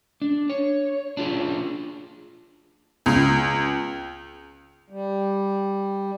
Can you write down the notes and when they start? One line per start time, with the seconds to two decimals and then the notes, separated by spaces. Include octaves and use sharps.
0.22 D4
0.50 C#5
1.17 D4 F4 G#4
3.06 C#2
4.90 G3